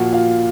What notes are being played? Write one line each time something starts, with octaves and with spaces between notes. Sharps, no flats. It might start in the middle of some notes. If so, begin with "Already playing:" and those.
Already playing: A#2 F3 F#4 F#5
F4 F5